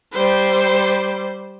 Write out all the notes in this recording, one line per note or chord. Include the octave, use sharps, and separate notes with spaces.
G3 C5